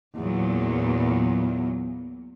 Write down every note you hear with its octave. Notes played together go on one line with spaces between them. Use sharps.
E2 A#2 F#3